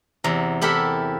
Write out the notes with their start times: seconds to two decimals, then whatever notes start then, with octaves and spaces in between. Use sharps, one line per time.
0.24 E2 C3 A#5
0.61 E4 G4 A4 A#4 E5 F#5